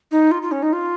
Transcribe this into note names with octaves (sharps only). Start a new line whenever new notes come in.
D#4
F4
F4
C#4
D#4
F4